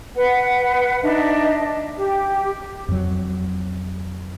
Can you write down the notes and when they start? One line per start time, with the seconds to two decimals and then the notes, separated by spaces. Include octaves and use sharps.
0.15 B4 F#5
1.02 D4 D#4 D#5 E5
1.97 G4
2.89 F2 F#3